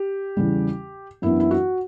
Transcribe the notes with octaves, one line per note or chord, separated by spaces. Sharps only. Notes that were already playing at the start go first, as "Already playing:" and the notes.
Already playing: G4
E2 C#3 G3
F#2 E3 B3 D4 E4
E4
F#4